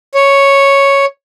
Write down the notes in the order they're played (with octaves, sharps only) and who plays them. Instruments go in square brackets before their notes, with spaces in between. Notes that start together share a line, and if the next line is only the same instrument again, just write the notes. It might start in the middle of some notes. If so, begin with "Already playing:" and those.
[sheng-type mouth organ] C#5